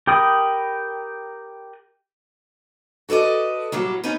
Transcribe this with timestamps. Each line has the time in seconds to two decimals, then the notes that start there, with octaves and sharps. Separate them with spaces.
0.07 G4 A#4 G5 B5 D#6
3.09 F#4 A4 B4 D5 D#5
3.72 A2 F#3 G3 A#3
4.04 C#4 D#4 F4 B4